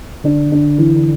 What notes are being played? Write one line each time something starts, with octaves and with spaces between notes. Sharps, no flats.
D3 D4
D4
E3